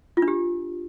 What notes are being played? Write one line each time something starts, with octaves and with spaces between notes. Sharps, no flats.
F4
D4
G4